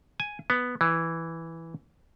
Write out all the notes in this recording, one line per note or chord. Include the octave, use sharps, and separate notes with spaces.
G#5
B3
E3